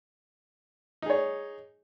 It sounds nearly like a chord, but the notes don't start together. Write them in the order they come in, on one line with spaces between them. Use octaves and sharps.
D#4 G#4 C#5